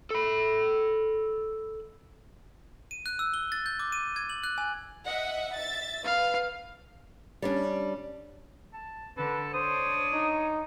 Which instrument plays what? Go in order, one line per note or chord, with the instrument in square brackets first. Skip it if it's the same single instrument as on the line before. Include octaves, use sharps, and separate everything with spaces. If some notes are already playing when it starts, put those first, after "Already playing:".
[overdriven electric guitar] A4 B5
[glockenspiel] D#7
F#6
E6
G7
A6
G6
D6
D#7
G#6
F#7
F#6
G#5
[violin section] D#5 E5 F#5
E5 A6
[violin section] B4 [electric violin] F5
[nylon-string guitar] G3 C#4 D4
[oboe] A5
[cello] D3 [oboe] A4 [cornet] B4
[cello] D4 C#5 [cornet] C5 [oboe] D#6
[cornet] D#4